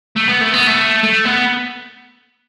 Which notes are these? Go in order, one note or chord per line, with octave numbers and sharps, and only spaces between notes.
A3
B3
A3
B3
A3
A3
B3